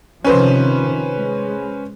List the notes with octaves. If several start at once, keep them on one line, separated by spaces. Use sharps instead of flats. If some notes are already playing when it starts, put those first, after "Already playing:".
C3 D#3 F3 C#4 B4 C5
G#3